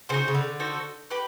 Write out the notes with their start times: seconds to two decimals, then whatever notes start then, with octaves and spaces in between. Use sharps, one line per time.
0.09 C#3 D#4 F#4 A4 C5
0.28 C#3
0.34 D3
0.60 D#4 F#4 A4 C5
1.10 G4 B4